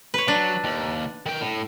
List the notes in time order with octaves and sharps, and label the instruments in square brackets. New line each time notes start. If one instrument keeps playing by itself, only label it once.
[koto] B4 C#5
[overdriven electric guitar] F#3 [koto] D4
[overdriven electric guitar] D#2
D#3 G5
A2